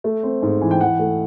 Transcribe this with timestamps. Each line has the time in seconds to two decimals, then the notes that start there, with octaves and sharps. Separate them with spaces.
0.04 A3
0.23 C4
0.42 G#2
0.61 E3
0.71 G5
0.80 E3 F#5
0.99 A3